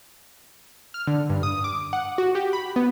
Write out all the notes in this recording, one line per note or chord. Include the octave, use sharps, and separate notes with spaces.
F6
D3
G2
D#6
D6
F#5
F#4
G4
B5
B3